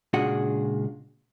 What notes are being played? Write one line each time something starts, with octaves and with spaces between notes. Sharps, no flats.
C#2 A#2 D4 F#4 G#4 F#5